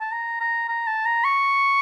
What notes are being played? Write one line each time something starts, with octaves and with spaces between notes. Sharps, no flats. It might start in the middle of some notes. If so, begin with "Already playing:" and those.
A5
A#5
A#5
A#5
A5
A#5
C#6